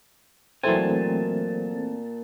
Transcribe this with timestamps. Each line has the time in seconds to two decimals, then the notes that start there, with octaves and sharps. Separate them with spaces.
0.63 A#2 E3 F#3 A3 C4 G#5 A5